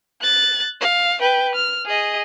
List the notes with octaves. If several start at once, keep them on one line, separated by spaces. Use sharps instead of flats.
F#6 A6
F5
B4 G5
F6
G#4 D#5